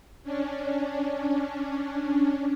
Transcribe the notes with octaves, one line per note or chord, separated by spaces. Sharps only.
C#4 D4